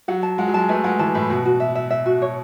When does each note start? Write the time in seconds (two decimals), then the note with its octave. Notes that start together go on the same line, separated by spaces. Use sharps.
0.08 F#3 F#5
0.23 A5
0.38 G#3 F#5
0.48 F#3
0.54 G#3 A5
0.69 A3 B4
0.84 G#3 F#5
0.99 E3 A5
1.14 A2 B4
1.30 B2 F#4
1.45 F#4
1.60 E5
1.75 E5
1.91 E5
2.06 F#4
2.22 C#5